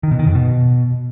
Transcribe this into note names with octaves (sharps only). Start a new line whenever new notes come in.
D#3
B2
D#3
F2
B2